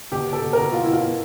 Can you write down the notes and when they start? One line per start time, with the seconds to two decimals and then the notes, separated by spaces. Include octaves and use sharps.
0.12 B2 G4
0.27 B2
0.33 A4
0.42 B2
0.53 B2 A#4
0.72 B2 F4
0.83 E4
0.88 B2
0.93 F4
1.03 B2